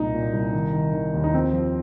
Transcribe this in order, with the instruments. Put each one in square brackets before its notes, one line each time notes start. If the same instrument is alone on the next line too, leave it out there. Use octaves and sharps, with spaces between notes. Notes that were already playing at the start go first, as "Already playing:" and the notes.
Already playing: [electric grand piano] C2 A#2 D#4
A#2
C2
D#3
D#3
D#3
D#2
D#4
F3 C4
F3